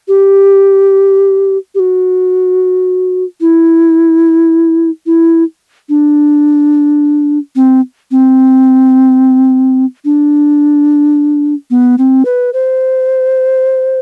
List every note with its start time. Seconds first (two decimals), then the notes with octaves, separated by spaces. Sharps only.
0.08 G4
1.75 G4
1.79 F#4
3.41 E4
5.06 E4
5.89 D4
7.56 C4
8.11 C4
10.05 D4
11.71 B3
11.98 C4
12.25 B4
12.53 C5